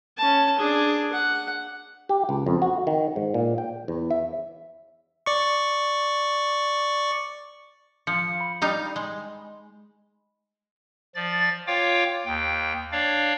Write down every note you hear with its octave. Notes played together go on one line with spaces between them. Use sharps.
C#4 A5
D4 G#4
F#5
G4
C#2
F2
F#4
D#3
G#2
A#2
G5
E2
E5
D5 C#6
F3 C#7
B5
G3 D#4 F5
G#3
F3 D5 A6
F4 C#5 F5 G5 D6
D#2 G5
D4 C#5 D5 F5